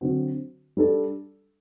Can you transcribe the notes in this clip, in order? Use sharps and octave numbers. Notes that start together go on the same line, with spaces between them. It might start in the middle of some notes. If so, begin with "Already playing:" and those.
D3 F#3 C4 F#4
G3 D4 A4